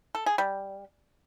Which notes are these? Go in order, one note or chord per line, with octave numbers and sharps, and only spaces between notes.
A4
G#4
G3